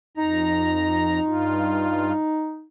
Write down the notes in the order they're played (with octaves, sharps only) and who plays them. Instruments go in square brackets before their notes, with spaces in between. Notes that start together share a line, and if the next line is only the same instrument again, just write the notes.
[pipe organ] F2 A#5 [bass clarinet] D#4
[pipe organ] G2 F4